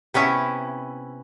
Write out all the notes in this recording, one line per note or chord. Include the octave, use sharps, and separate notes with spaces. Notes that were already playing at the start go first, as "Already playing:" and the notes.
C3 B3 C#4 E4